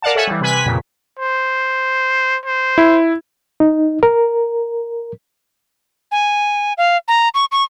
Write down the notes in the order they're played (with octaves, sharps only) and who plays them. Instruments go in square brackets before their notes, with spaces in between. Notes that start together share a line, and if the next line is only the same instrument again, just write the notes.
[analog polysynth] A#4 D5 F5 F#5 A5
A4 C#5 E5 F#5 G#5
E3 G3
C3 B4 G#5 B6
F2 A#2 C#3
[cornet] C5
C5
[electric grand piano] E4
[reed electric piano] D#4
A#4
[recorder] G#5
F5
A#5
C#6
C#6